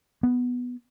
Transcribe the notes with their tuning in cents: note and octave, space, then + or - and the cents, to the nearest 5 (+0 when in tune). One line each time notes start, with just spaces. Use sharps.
B3 +0